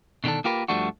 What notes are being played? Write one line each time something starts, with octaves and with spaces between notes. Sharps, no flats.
B2 D3 D#3 D4 A4
A#3 F4 G4 A#4 B4
G2 F3 G3 A3 D4 F#4